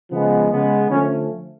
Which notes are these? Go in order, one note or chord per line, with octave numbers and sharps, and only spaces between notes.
C#3 F3 G#3 B3
C#3 G#3 B3
D3 F3 A3 C#4